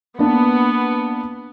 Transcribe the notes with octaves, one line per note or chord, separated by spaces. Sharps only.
A#3 B3 D4